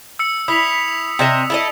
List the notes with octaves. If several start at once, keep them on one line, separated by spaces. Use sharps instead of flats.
E6 C#7
E4 D#6 B6 F7
C3 D#5 E5
E4 A4 D#5